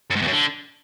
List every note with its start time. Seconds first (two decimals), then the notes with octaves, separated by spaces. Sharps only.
0.10 F#2
0.16 G#2
0.22 E2
0.27 F#2
0.33 D3